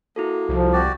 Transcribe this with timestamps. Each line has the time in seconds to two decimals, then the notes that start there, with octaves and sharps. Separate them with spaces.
0.16 A#3 E4 F#4 A4
0.49 C2 F3
0.73 F#4 G4 D5